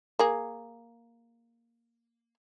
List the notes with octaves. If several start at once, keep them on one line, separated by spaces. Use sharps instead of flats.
A#3 G#4